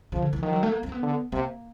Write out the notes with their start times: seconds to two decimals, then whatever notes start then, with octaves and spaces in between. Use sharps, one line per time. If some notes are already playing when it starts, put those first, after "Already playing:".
0.12 C#3 F3
0.22 D3
0.33 E3
0.43 D#3 F3
0.53 F#3
0.63 A3
0.72 A#3
0.83 C4
0.89 A#3
0.92 B3
1.03 D3
1.32 C3 A#3